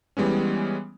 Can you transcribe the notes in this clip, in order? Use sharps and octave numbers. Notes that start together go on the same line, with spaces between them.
E3 G3 G#3 B3 C#4